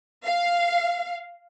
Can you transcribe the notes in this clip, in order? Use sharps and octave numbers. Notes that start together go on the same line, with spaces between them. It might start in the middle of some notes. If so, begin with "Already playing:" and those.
F5